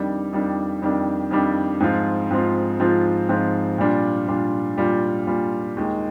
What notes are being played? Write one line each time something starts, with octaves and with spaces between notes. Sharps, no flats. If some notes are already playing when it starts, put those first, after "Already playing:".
Already playing: F2 D#3 G3 D4
F2 D#3 G3 D4
F2 D#3 G3 D4
F2 D#3 G3 D4
G#2 F3 C4 F4
G#2 F3 C4 F4
G#2 F3 C4 F4
G#2 F3 C4 F4
A#2 G3 D4 F4
A#2 G3 D4 F4
A#2 G3 D4 F4
A#2 G3 D4 F4
D#2 D#3 G#3